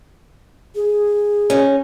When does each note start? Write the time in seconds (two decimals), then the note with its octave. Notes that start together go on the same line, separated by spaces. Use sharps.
0.75 G#4
1.50 C#4 D#4